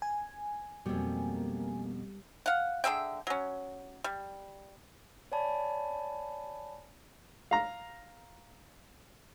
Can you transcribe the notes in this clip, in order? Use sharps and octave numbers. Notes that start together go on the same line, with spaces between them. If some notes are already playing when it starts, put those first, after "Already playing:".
G#5
F2 B2 G3 A#3
F5 F#5
D3 G#4 E5 G5
F#3 C#4
G3
C#5 D5 G#5 A5 B5
F5 A#5